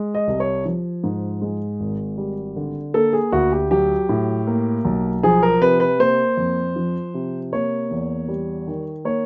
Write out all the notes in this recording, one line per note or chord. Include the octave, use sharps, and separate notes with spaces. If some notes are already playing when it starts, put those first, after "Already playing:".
Already playing: G#3
D#5
C2
C#5
F3
G#2
G#3
G#1
G3
D3
A#3 A4
G#4
D2 F#4
G4
F#3 G4
A2
A#3
B1
F3 G#4
A#4
C3 B4
B4
A#3 C5
F2
F3
C3
A#3 C#5
E2
G3
D#3
A#3 C#5